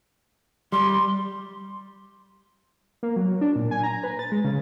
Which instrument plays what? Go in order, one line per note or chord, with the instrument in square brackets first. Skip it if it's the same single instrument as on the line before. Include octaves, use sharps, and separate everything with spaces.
[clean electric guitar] G3 [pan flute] C6
[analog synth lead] A#3
F#3
D4
A#2
G#5
A#5
B4
A6
G#3
C#3